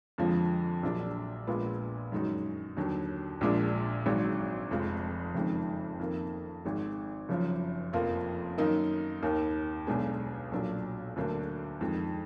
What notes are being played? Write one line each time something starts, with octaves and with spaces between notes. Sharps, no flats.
F2 D3 F3 G#3
A#1 A#2 F#3 D4
A#1 A#2 G#3 B3 F4
F#2 D#3 G#3 D#4 F#4
D#2 D3 F#3
A#1 A#2 G#3 D4
G#1 G#2 F#3
F1 F2 F3 G#3
F#1 F2 D#3 G#3
F2 D#3 A#3
G#1 G#2 D#3
F#1 F#2 F3
F1 F2 F3 A#3 F4
F#2 D#3 A#3 D#4 A#4
D#2 D#3 A#3
B1 B2 G#3 D4 G#4
B1 A#2 F#3 D4
D2 D3 F#3 A#3 D4
F2 D#3 G#3